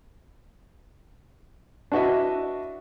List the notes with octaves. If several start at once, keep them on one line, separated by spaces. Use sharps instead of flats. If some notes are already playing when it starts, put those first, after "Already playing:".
D4 E4 F#4 B4 D#5 E5